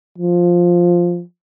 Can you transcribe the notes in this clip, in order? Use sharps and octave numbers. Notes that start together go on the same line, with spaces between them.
F3